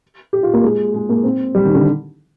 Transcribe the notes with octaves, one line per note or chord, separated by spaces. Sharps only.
G4
F4
A#3
G#3
G#3
A#3
C4
G3
D#3
D3